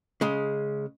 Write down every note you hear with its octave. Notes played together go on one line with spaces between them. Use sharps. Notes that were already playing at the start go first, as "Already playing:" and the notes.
C#3 G#3